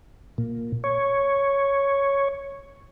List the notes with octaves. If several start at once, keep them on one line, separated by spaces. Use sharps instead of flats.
A#2
C#5